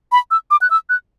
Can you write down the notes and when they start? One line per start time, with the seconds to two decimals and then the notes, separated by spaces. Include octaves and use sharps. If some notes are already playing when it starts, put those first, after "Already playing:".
0.12 B5
0.31 E6
0.51 D6
0.61 F#6
0.70 E6
0.89 F#6